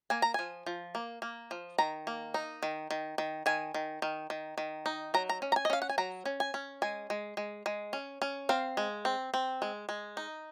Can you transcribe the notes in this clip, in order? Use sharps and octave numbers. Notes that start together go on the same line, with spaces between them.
A#3 G#5
A#5
F3 G#5
F3
A#3
A#3
F3
D#3 A#5
A#3
D#4
D#3
D#3
D#3
D#3 G#5
D#3
D#3
D#3
D#3
D#4
F#3 A#5
A#5
C#4
A#5
G#5
D#5
C#4 F5
F#5
G#5
F#3 A#5
C#4
G#5
C#4
G#3 G#5
G#3
G#3
G#3
C#4
C#4
C4 F5
G#3
C4
C4
G#3
G#3
D#4